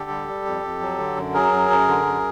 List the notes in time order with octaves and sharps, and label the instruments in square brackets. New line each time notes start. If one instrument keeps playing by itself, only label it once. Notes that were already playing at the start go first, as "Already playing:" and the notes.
Already playing: [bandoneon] D3 G4 A4
G3
G3
F2
F2
F#3
D3
F#2
F#3 G#4 A#4
F#2
F#2
D3
F#2